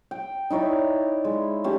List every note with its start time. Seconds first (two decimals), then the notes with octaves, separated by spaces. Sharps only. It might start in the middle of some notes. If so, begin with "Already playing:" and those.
0.11 G5
0.50 D#4 E4 C#5 D5
1.25 G#3
1.64 A3 C#4 G4